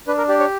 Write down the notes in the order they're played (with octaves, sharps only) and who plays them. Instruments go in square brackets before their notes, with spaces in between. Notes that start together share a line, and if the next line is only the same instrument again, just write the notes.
[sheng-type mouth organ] D4 B4
A#4
G4 D5
C#5